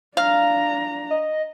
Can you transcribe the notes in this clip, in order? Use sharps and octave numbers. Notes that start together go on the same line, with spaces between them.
D4 F5 A#5
D#5